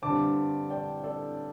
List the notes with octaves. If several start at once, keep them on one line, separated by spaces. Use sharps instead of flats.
G2 D3 C4 A5 D6
D5 G5
A4 D5